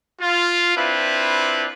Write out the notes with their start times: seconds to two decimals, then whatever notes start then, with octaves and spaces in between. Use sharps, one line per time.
0.20 F4
0.76 C4 D4 E4 F4 B4